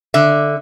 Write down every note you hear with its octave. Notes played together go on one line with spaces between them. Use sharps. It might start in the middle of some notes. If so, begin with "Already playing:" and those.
D3 E5